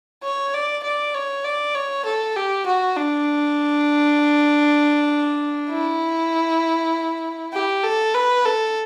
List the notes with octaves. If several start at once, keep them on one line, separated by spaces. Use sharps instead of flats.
C#5
D5
D5
C#5
D5
C#5
A4
G4
F#4
D4
E4
G4
A4
B4
A4